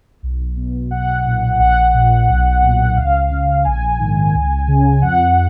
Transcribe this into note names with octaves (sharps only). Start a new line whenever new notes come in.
B1
B2
B1 F#5
A#2
A#1 F#5
A#2
B1
A#2
C#2 F5
C#3
A#1 G#5
G#2 D#3
C#2
C#3
F2 F#5